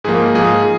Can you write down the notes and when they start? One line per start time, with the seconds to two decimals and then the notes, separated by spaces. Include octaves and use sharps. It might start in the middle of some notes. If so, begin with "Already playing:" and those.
0.04 G#2 F3 A#3 G#4
0.34 G#2 F3 A#3 G#4